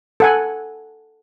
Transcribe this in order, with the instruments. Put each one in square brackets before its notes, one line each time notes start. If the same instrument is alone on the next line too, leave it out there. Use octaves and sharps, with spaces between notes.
[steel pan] A4 F#5 G#5